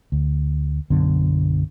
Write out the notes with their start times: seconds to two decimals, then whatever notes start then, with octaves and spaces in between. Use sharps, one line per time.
0.12 D2
0.90 B1 F#2 D3 B3